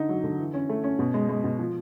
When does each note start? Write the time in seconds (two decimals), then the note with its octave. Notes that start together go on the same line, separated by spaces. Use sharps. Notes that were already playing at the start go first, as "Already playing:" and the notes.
Already playing: D3 D#4
0.09 F#3
0.24 D3
0.39 E3
0.54 C#4
0.69 A3
0.84 C#4
0.99 B2
1.14 G#3
1.29 G#3
1.44 B2
1.59 F3